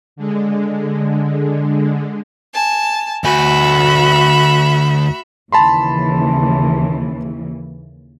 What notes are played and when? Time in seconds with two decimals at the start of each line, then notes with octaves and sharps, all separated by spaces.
0.16 D3 G#3
2.55 G#5 A5
3.24 D2 F#4 E5 G#5 B5
5.52 D#2 C#3 E3 A5 B5 C6